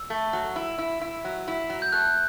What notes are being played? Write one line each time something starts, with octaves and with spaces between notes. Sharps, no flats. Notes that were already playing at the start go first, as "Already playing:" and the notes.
Already playing: E6
A3
F#3
E4
E4
E4
F#3
E4
F#3
G6
A3 F#6